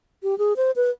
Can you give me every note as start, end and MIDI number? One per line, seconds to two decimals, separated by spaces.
0.23 0.38 67
0.38 0.53 68
0.57 0.71 72
0.76 0.90 71